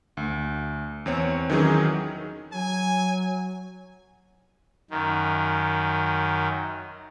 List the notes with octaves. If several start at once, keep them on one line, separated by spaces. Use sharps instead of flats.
D2
E2 C4 C#5
D#3 E3 F#3 C#4 D#4 G#4
F#3 G#5
F#2 D#3